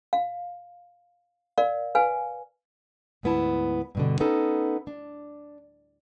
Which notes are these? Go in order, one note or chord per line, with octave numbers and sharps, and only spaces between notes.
F5
A#4 D5 F5
B4 F5 G#5
D2 G#2 B3 E4 A5
G2 B2 D3
B3 C#4 D#4 A4
D4